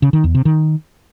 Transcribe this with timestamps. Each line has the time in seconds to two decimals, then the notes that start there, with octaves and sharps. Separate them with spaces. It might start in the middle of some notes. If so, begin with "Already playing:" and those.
0.02 C#3
0.13 D#3
0.24 E2
0.35 C3
0.45 D#3